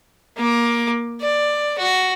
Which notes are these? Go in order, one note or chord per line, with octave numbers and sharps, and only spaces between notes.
A#3 D6
D5
F#4